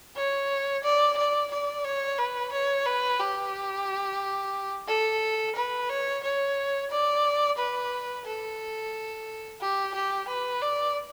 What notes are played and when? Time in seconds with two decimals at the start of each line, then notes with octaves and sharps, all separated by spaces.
0.16 C#5
0.84 D5
1.18 D5
1.51 D5
1.85 C#5
2.18 B4
2.52 C#5
2.86 B4
3.20 G4
4.88 A4
5.56 B4
5.90 C#5
6.23 C#5
6.90 D5
7.58 B4
8.25 A4
9.61 G4
9.94 G4
10.28 B4
10.62 D5